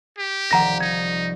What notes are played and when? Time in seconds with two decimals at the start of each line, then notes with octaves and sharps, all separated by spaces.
0.18 G4
0.51 C2 D#3 F3 F#5 A#5 A#6
0.80 D#4 G#6